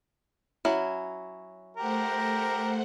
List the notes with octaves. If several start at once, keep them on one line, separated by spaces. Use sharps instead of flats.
F#3 C#4 E4
A3 G4 A#4 C5 F#5 A#5